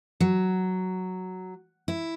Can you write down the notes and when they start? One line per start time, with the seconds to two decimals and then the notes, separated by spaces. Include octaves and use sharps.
0.20 F#3
1.88 E4